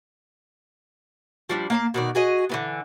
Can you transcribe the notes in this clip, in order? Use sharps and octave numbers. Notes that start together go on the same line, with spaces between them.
F3 G3 D4
A#3 F5 A5
B2 D#3 D5
F#4 G#4 D#5
D3 E3 B3